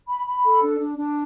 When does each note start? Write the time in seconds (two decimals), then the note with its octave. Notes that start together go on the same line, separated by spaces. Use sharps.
0.08 B5
0.26 B5
0.44 A4
0.62 D4
0.80 D4
0.98 D4